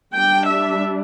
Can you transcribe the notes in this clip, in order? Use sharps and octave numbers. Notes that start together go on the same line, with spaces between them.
G3 D4 G5
E5